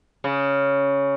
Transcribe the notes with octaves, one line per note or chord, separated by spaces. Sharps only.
C#3